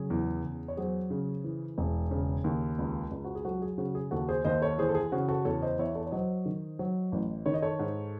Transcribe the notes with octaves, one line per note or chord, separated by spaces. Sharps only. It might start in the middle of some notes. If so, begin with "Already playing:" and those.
Already playing: C#3 F#3 G#4
E2
E2
C#5
F#3 G#4 C5
C#3
E3
E1
C#3
D#2
C#2
C#2
F#4
G#4
F#3 F#4 A4
G#4
C#3 F#4
G#4
D#2 F#4 A4
G#4 C5
D#2 C5 D#5
A4 C#5
E3 G#4 C5
A4
G#4
C#3 F#4
F#4 A4
E2 A4 C#5
C5 D#5
E2 C#5 E5
A4 C#5
C#5
F#3 C5 D#5
D#3
F#3
A1
D#3 C#5
D#5
A4 C#5
G#2